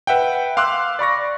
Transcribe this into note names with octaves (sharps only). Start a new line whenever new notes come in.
B4 E5 F#5 G5
F5 C6 D6 E6 F#6
D5 B5 C#6 A#6